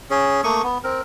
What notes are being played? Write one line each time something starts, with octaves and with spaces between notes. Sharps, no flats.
C#4 G#4
A3 A#3 C#6 D#6
B3
C4 A#4